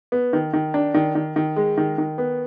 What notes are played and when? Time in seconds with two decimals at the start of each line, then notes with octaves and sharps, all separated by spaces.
0.12 B3
0.33 D#3
0.53 D#3
0.74 D4
0.94 D#3
1.15 D#3
1.36 D#3
1.56 G#3
1.78 D#3
1.98 D#3
2.18 B3